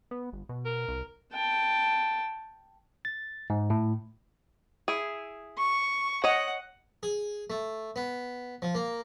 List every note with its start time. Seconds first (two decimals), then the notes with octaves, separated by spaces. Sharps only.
0.11 B3
0.32 G1
0.49 B2
0.65 A#4
0.88 C2
1.33 G5 A5
3.05 A6
3.50 G#2
3.70 A2
4.88 E4 G#4
5.58 C#6
6.24 C#5 D#5 F#5
7.03 G#4
7.50 A3
7.96 B3
8.62 F3
8.75 A#3